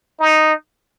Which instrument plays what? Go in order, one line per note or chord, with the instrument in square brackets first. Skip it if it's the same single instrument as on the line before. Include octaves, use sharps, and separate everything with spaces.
[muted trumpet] D#4